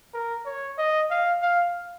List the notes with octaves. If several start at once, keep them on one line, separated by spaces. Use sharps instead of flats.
A#4
C#5
D#5
F5
F5